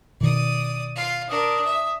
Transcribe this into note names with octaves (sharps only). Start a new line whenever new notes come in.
B2 D#3 D5 D#6
F4 F5
D4 A#4 D#6
E5